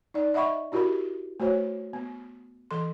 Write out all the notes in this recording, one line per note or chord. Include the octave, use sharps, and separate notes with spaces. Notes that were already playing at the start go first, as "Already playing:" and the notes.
D#4 D5
D#5 E5 F#5 B5 C#6
D4 E4 F#4 G4 A#4 B5
A3 F#4 C5 C#5
B3
E3 A4 C6